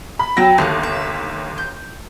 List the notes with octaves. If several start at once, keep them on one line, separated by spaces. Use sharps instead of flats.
B5
F#3 G5 B5 E6 A#6
G1 D#2 A3 B3 F#6
E5
G6